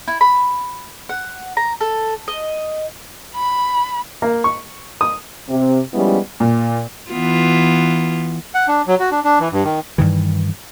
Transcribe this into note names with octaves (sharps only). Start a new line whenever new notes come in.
E4
B5
F#5
A#5
A4
D#5
B5
A#3
C#6
D#6
C3
F3 G3 G#3 B3 C#4 E4
A#2
E3 B3 F4
F#5
D4
F#3
F#4
D4
D4
E3
G2
D#3
G2 D#3 E3